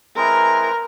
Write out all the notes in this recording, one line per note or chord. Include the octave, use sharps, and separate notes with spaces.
G#3 C4 E4 G#4 A#4 B4